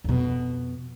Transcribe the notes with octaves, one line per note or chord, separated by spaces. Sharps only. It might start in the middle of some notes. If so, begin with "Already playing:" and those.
F2 B2